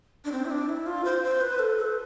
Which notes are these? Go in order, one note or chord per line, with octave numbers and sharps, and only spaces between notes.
D4
C4
E4
D4
E4
F4
C5
C5
B4
A4
A4